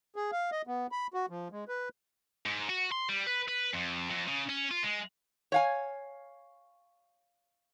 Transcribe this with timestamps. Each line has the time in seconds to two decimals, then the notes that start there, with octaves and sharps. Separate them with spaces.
0.16 G#4
0.32 F5
0.52 D#5
0.67 B3
0.92 B5
1.14 F#4
1.30 F3
1.52 G#3
1.69 B4
2.45 G#2
2.69 F#4
2.92 C6
3.09 G3
3.27 B4
3.49 B4
3.74 F2
4.10 F2
4.28 C#3
4.49 C#4
4.71 F4
4.83 G#3
5.52 C#5 F5 G#5